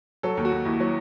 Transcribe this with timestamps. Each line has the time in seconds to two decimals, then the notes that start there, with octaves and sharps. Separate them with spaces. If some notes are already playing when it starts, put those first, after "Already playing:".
0.23 F#3 A4
0.37 D#2
0.45 F#4
0.52 D#2
0.65 D#2 E4
0.80 F#3